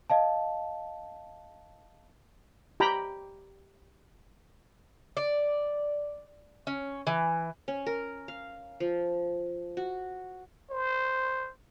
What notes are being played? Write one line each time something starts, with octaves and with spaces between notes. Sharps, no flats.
D#5 F5 A5
G4 G5 A#5 B5
D5
C#4
E3
C#4
A#4
F5
F3
F#4
C5